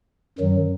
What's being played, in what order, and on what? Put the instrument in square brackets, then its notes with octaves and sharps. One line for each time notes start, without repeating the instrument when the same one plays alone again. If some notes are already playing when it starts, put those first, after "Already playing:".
[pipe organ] F#2 D#3 F#3